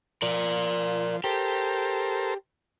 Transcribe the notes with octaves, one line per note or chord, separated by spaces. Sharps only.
F3 A#4 D5
G4 A4 A#4 C5